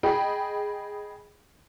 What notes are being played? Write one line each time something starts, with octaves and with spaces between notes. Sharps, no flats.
G#4 D#5 G5 B5